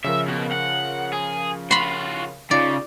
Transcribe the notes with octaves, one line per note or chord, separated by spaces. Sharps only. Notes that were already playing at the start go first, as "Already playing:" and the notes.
C#3 F3 A#4 E5
B2
F#5
G#4
F4 F#4 B5 C6
C#3 D#4 F4 D5